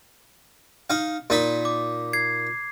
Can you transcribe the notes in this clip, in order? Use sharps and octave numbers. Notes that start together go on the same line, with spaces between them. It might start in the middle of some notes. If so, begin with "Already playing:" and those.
D#4 F5
A#2 D#4 B5
D6
G#6 C7